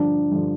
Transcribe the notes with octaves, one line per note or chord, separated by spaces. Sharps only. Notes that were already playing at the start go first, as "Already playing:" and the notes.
Already playing: G2 D3 F3 D4
G2 D3 F3